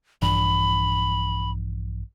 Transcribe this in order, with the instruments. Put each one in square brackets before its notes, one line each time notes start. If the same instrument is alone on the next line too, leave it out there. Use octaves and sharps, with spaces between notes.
[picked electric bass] A#1 G2 E3 [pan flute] B5